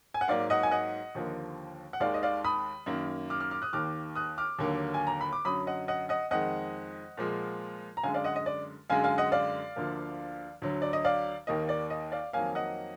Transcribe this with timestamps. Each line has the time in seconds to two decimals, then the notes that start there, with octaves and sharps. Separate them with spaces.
0.14 G#5
0.21 F#5
0.28 G#2 F#3 A#3 D5 F5
0.50 D#5 F#5
0.63 G#5
0.71 D#5 F#5
1.15 D#2 D3 F3 A#3
1.93 F#5
2.00 D#2 D#3 G#3 D5 F5
2.14 D#5
2.23 D5 F5
2.44 B5 D#6
2.86 F#2 D#3 A#3
3.30 D6 F6
3.40 D6 F6
3.51 D6 F6
3.62 D#6 F#6
3.73 D#2 D#3 A#3 D6 F6
4.15 D#6 F#6
4.38 D6 F6
4.58 D#2 D3 F#3 A#3
4.94 G#5
5.07 A#5
5.21 B5
5.33 D6
5.45 F#2 D3 F#3 B5 D#6
5.67 D#5 F#5
5.88 D#5 F#5
6.09 D#5 F#5
6.31 F2 D#3 G#3 D#5 F#5
7.17 A#2 F3 G#3
7.97 A#5
8.03 F#2 D3 G#3 F5 G#5
8.14 D5 F5
8.24 D#5 F#5
8.36 D#5
8.46 D5
8.90 F#2 D3 G#3 F5 G#5
9.04 F5 G#5
9.18 D#5 F#5
9.32 D5 F5
9.76 D2 D3 F3 A#3
10.62 D2 D3 F#3
10.82 D5
10.93 D#5
11.05 D5 F5
11.47 D#2 D#3 A#3 D#5
11.69 D5
11.90 D#5
12.12 D5 F5
12.33 F2 D#3 F#3 A#3 F5 G#5
12.55 D#5 F#5